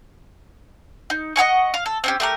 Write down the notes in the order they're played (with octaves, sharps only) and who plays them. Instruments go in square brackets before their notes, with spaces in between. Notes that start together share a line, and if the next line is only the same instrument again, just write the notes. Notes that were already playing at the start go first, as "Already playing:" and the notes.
[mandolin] D#4
D#5 F#5 G#5 C#6
F5
A4
C4 C#4 G4
A3 G4 A#4